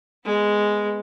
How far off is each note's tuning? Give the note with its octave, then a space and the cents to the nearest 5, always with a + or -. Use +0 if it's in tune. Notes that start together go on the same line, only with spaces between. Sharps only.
G#3 +0 B3 +0